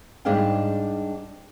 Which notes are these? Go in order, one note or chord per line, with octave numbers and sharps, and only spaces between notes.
G#2 G3 D4 G#4 F5 G5